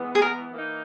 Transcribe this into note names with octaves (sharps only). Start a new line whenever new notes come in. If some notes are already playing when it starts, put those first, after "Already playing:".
Already playing: E3 G#3 B3
G#4
A#4
E3 A#3 D#4